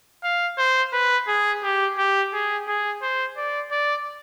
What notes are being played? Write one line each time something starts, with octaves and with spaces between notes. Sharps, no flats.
F5
C5
B4
G#4
G4
G4
G#4
G#4
C5
D5
D5